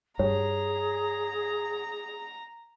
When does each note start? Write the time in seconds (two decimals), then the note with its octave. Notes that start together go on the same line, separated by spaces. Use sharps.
0.19 G2 G#4 C#5 A#5